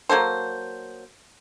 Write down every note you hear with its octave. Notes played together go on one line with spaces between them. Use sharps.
F#3 A#3 A4 C5